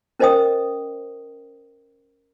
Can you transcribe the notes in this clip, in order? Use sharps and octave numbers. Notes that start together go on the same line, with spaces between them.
C#4 A#4 C5 D#5 G5 D#6